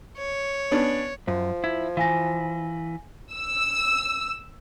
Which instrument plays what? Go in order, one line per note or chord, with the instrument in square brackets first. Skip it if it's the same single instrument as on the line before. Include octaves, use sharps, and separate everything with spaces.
[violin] C#5
[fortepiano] B3 C#4 D4
[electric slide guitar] F#2 [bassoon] F3
[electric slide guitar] E4 [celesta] G#6
[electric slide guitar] E3 [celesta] F5 G#5 A#6
[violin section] E6